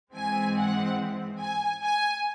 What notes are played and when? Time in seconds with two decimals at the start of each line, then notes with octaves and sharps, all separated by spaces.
0.14 G#2 E3 G#3 C4 G#5
0.56 F#5
1.39 G#5
1.82 G#5